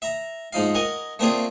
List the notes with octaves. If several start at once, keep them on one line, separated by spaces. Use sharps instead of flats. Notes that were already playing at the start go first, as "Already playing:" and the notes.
E5 A#5
G#2 F3 D#4 F5
A#4 D#5 F#5 G#5
A3 A#3 C4 D4 F4 G#4